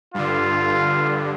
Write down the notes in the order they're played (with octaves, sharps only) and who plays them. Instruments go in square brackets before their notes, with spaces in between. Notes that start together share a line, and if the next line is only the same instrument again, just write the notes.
[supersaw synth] G2 D3 [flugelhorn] F4